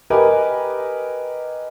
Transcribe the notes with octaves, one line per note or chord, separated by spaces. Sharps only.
G4 A#4 B4 D#5 G#5